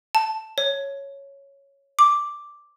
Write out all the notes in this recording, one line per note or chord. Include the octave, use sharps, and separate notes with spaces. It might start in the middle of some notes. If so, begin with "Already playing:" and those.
A5
C#5
D6